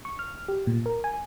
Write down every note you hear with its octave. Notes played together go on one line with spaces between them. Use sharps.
C#6
F6
G4
A#2
A#4
G#5